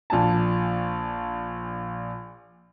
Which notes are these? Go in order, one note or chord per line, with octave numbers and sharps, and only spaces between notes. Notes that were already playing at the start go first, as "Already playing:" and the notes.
A#1 A#2 D4 D5 G#5 A5